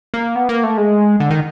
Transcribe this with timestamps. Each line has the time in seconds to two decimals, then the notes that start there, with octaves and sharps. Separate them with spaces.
0.14 A#3
0.35 B3
0.49 A#3
0.63 A3
0.77 G#3
1.20 D3
1.30 D#3